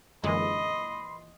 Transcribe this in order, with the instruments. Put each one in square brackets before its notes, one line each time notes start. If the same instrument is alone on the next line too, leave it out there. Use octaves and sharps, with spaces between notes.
[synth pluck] F#2 D3 G#3 [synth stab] A#2 E3 [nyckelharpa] D#5 [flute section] B5 C6